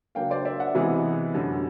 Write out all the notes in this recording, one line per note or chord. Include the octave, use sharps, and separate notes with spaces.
C#3 F#3 A#3 D4 F5 G5
C5 D5
D5 E5
E5 F#5
C3 E3 G#3 B3
F#2 D3 G3